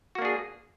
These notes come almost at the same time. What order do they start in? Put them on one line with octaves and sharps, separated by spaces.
F#4 A#3 D4 G#4